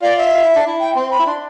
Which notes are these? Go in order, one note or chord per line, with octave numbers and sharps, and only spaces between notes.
F4 D5
E5
F4
E4
D4
E4
G5
C4 C6
B5
E4
D4 C6